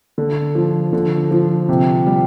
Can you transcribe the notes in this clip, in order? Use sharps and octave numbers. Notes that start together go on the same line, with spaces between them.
D3
F3
D3
F3
C3
G3